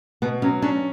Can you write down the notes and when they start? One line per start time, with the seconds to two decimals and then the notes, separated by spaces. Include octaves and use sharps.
0.22 B2 B3
0.42 F#3 C#4
0.62 C#4 D4